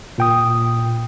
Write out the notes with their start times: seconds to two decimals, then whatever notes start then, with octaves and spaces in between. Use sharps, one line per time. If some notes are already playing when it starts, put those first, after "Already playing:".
0.18 A#2 G5 D#6